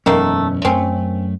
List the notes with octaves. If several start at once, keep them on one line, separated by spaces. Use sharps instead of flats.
E1 F#2 D#3 A3 A#3 C#4
F#2 A3 C4 C#4